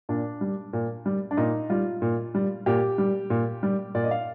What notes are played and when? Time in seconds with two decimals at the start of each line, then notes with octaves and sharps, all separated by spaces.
0.09 A#2 D4
0.41 G3
0.73 A#2
1.06 G3
1.31 D4
1.37 A#2 D#4
1.70 G3 F4
2.02 A#2
2.35 G3
2.66 A#2 G4
2.98 G3
3.30 A#2
3.63 G3
3.95 A#2 D5
4.04 D#5
4.11 F5